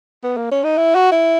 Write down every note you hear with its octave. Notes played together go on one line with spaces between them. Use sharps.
B3
A#3
C#4
D#4
E4
F#4
E4